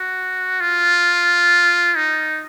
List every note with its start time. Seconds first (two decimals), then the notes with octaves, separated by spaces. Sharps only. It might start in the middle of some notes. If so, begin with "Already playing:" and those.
Already playing: F#4
0.61 F4
1.96 D#4